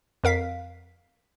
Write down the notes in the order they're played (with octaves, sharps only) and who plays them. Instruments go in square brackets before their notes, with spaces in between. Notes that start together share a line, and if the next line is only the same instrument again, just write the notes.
[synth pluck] F2 A#4 F5 B6